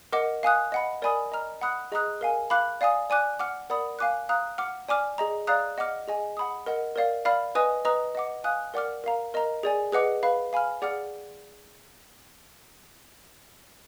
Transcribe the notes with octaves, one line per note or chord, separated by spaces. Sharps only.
A#4 D#5 F#5 D6
F5 G#5 D#6 F#6
D#5 F#5 B5
A#4 D5 G#5 B5 D#6
D#5 A#5 F6
F#5 B5 D#6 F#6
G#4 D#5 A#5 D#6 F#6
A#4 F5 G#5
F5 B5 D6 F#6
D5 F5 G#5 D#6
D5 G#5 D6 F#6
F#5 D6 F6
A#4 D5 F#5 B5 D#6
F5 G#5 D6 F#6
F5 A#5 D#6 F#6
F#5 D6 F6
D5 G#5 D6 F6
G#4 D#5 A#5
D5 F5 A#5 D#6 F#6
D#5 F#5 D6 F6
G#4 D#5 G#5
F#5 B5 D#6
A#4 D#5 F#5
A#4 D5 F5
D5 F5 B5 F6
B4 D#5 G#5 D#6
B4 D#5 A#5 D#6
D#5 F#5 D6
F5 G#5 D#6 F#6
A#4 D5 F#5 D6 F6
A#4 F5 A#5
A#4 D#5 A#5
G#4 D5 G#5
G#4 B4 D#5 F#5 D6
B4 F5 B5
F5 G#5 B5 F6
G#4 D5 F#5 D6 F6